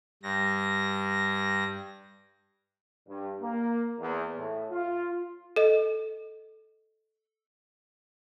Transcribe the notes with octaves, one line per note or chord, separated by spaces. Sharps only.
G2 A#6
G2
A#3
E2
A2
F4
A4 D#5